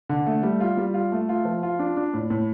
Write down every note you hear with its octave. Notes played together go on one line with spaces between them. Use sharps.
D3
A3
G3
F4
G3
F4
A3
F4
F3
F4
D4
D4
A2
A2